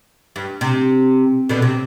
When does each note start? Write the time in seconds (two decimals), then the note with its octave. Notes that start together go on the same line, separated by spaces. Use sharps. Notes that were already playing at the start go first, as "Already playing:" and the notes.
0.36 G2
0.61 C3
1.49 B2 D3
1.62 C3